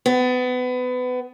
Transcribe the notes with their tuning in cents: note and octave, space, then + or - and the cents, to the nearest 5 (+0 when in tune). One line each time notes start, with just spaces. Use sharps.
B3 +25